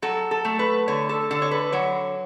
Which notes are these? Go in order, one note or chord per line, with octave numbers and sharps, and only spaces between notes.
F#3 A4
A4
A3
B4
D3 C#5
A4
D3 A4
C#5
B4
F#3 C#5